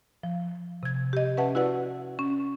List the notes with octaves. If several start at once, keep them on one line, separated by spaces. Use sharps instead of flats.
F3
C3 G#6
G4 D#5
C#4 B4 E5 F#5 A5
E4 F#4 B4 D5 F#5
C#4